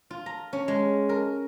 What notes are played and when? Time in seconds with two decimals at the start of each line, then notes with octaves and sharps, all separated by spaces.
0.10 F4
0.26 A#5
0.53 C#4
0.68 G#3
1.09 A#4